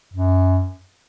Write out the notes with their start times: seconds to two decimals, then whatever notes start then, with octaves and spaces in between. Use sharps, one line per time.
0.13 F#2